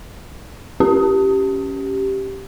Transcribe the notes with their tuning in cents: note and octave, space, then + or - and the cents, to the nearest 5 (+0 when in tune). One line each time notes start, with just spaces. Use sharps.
C#4 +0 G4 -10